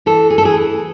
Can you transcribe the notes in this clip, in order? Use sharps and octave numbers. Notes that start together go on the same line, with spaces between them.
E3 A4
G#4
A4
E3 G#4